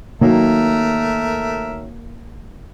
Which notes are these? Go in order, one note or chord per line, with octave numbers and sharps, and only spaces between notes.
D#3 F#3 A3 A#3 A#4 E5